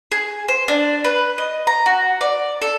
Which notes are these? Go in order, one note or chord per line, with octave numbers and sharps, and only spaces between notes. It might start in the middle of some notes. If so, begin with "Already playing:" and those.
G#4
C5
D4
B4
D#5
A#5
F#4
D5
A4